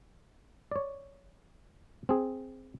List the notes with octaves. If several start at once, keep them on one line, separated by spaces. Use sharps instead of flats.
C#5 D5
C4 G#4